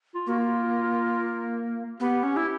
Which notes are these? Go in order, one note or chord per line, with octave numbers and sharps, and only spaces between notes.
F4
A#3 F#4
F4
B3 G4
C#4
E4 G4